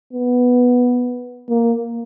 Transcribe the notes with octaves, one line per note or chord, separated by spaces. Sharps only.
B3
A#3